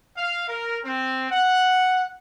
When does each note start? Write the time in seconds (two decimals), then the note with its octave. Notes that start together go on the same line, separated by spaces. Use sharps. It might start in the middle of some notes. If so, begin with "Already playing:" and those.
0.17 F5
0.48 A#4
0.85 C4
1.31 F#5